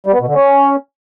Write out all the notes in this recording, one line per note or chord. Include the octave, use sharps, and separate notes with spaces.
G3
B3
B2
D3
C#4